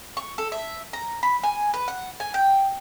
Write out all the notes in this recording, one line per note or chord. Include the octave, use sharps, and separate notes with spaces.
C#6
A4
E5
A#5
B5
G#5
B4
F#5
G#5
G5